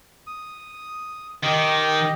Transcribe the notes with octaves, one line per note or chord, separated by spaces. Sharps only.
D#6
D#3 G4 D#5